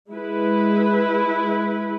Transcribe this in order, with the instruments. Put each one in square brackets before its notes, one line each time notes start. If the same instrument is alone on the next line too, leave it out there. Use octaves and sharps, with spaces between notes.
[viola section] G#3 E4 B4